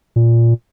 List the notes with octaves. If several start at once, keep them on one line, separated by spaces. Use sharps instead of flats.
A#2